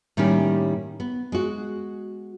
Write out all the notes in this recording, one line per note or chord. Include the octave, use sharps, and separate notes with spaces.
A2 D#3 G3 A#3 C#4 G4
B3
G#3 F#4